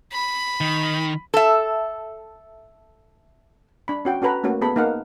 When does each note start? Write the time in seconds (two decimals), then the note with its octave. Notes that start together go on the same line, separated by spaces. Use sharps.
0.12 B5
0.61 D#3
1.34 A4 E5
3.88 D4 B5
4.05 C#4 F#4 G5
4.22 C#4 F#4 A4 B4 A#5 B5
4.44 A3 A#3 C#4 F#4
4.61 B3 G#4 A4 B5
4.76 A#3 D#4 F5 F#5